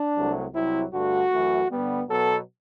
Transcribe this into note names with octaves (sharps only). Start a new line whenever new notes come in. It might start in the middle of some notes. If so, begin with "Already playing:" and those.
Already playing: D4
C2 C3 F#3 A3
C2 C3 F#3 E4
G2 D3 A3 F#4
F#2 E3 A3
G2 D3 G3 B3
B2 F#3 B3 A4